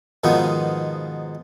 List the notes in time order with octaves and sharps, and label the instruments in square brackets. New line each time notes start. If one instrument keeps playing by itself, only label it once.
[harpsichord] G#2 B2 D#3 F3 B3